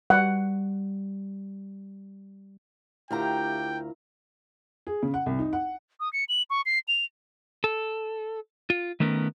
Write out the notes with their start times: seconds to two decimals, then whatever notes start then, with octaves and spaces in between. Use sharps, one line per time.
0.10 G3 F#5
3.11 D2 E4 F4 G4 A#4 F5 G5 A#5
4.87 G#4
5.03 C#3
5.14 F#5
5.26 C2
5.39 D#4
5.53 F#5
6.00 D#6
6.13 C#7
6.29 F#7
6.50 C#6
6.66 C7
6.88 F7
7.64 A4
8.70 F4
9.00 D#3 A3 B3 C#4 A#4